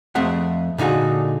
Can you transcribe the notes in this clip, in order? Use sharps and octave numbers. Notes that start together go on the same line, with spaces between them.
F2 A3 C4 G#4 E5 F#5
A#2 D3 D#4 F#4 G#4